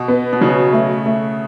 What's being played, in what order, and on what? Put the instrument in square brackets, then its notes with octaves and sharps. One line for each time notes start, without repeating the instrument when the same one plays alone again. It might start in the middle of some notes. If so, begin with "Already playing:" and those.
Already playing: [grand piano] B2
[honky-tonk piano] B3
[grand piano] B2
[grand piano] C#3 [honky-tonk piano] F#3
[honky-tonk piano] A3
A3